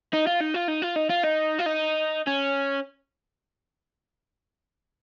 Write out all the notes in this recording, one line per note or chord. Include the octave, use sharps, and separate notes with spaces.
D#4
F4
D#4
F4
D#4
F4
D#4
F4
D#4
F4
D#4
C#4